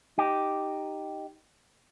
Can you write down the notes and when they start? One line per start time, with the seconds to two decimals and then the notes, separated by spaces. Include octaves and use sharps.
0.18 D#4 G4